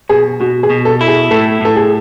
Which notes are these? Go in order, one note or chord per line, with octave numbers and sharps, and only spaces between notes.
B2 G#4
B2 F#4
G#4
B2
A4
E4
G#4
A2 A4
A2 A4
G#4